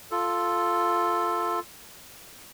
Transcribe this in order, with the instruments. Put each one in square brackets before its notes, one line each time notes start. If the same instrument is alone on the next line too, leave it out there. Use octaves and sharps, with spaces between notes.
[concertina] F4 A4